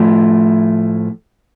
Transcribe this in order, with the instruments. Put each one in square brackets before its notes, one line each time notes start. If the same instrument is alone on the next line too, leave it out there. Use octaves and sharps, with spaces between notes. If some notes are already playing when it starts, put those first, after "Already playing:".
Already playing: [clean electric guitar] A2 F3 A3